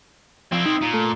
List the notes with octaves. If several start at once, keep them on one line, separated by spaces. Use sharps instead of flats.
F3 C4 E4
D#4
A#2
A3